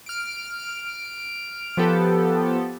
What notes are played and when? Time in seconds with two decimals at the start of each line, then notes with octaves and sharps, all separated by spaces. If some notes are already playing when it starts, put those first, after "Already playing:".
0.06 F6 D7
1.77 F3 B3 G4 A4